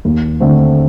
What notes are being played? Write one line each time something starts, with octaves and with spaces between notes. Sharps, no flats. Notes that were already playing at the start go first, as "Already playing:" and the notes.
D#2
D3 A3 C4